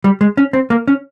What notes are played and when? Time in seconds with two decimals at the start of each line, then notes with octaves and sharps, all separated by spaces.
0.04 G3
0.21 G#3
0.37 C#4
0.53 C4
0.70 A#3
0.88 C#4